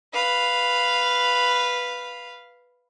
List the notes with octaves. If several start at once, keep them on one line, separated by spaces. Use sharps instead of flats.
B4 F5